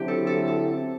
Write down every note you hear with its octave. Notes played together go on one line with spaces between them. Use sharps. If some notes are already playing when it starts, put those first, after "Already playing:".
Already playing: D3 F#3 C4 D4 E4 G4
A4
A4
A4
C4